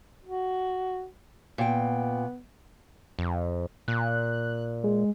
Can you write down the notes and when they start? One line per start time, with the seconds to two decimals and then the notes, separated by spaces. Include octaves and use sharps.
0.25 F#4
1.58 A#2 B3 G5
3.19 F2
3.88 A#2 F#6
4.84 G#3